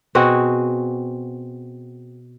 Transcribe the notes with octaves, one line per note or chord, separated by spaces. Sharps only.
B2 C4 F#4 G#4